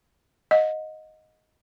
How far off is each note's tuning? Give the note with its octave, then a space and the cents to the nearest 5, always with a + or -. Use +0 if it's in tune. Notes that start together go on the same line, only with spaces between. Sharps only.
D#5 +0 F#5 -40